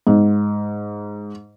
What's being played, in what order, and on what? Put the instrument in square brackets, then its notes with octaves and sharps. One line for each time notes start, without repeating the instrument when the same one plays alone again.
[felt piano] G#2